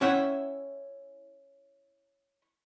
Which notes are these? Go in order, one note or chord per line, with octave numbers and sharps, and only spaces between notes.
C#4 E4 C#5 E5 F#5 G5